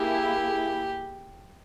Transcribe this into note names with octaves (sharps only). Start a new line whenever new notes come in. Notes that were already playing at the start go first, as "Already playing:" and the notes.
Already playing: A#3 E4 G4 G#4